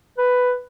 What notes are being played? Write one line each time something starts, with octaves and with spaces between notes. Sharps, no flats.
B4